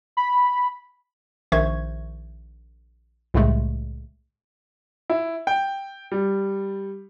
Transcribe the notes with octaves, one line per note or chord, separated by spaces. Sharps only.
B5
A#1 D#3 C5 E5 C#6 G#6
C2 A2 C#3 G#3 A3
E4
G5
G3